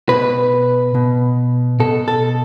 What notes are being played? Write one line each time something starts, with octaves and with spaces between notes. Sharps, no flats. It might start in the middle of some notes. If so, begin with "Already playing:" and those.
B2 B4
B2
B2 A4
A4